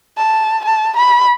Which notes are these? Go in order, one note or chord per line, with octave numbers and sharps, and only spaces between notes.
A5
A5
B5